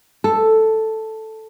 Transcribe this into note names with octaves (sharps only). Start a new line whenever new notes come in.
A4